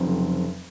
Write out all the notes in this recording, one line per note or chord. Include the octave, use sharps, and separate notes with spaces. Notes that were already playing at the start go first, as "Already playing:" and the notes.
Already playing: F1 F2 C#3 F#3 C4